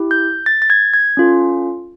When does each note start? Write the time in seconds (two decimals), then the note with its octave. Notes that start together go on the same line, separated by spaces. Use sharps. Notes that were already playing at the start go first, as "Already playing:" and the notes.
Already playing: E4 G4
0.11 G6
0.46 A6
0.62 A6
0.70 G#6
0.93 G#6
1.17 C#4 F4 A4